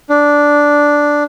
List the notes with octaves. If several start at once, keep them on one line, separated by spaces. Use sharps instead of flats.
D4